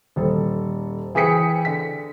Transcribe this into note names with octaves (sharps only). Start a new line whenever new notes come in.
D#1 A4
E3 G#4 G5 B6 C#7
D3 B6